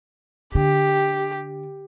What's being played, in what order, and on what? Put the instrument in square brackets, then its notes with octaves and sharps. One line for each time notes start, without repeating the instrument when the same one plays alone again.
[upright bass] D3 [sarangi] G4